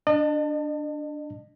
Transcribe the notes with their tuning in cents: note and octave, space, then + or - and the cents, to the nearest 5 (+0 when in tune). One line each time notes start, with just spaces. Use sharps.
D4 +0 D#5 -40 A5 +25